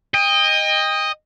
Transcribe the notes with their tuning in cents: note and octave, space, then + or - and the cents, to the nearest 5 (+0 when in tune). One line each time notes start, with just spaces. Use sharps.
D#5 +0 G5 +35